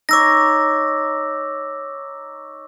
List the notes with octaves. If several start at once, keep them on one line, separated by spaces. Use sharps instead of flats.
D#4 C#5 D6 E6 A#6